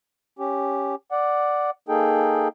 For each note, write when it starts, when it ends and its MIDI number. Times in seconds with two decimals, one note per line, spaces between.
0.39 0.95 61
0.39 0.95 67
1.11 1.70 74
1.11 1.70 78
1.88 2.48 58
1.88 2.48 63
1.88 2.48 68
1.88 2.48 69
1.88 2.48 79